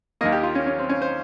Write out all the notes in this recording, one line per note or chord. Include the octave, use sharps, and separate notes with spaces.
D#2 D#3 A#3 D#5
G4
F4
C#4
C#4
C4
C#4
C5